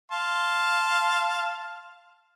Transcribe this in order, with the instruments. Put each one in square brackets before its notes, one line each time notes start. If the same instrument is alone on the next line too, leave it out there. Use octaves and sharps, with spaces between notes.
[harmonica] F5 A5 C6